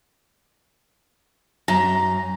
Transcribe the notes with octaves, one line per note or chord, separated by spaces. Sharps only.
F#2 A#5